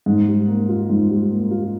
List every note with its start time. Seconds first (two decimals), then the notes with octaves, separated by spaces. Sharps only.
0.06 G#2
0.27 G3
0.47 A#3
0.69 F4
0.89 G#2
1.10 G3
1.30 A#3
1.51 F4